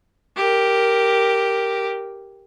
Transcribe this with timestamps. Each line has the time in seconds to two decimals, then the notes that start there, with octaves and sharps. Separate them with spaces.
0.36 G4 A#4